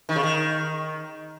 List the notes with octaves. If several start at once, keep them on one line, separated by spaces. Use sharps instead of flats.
D#3
C#3
D#3